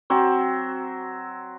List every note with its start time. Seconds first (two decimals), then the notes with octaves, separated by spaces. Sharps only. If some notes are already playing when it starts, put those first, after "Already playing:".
0.10 F#3 C4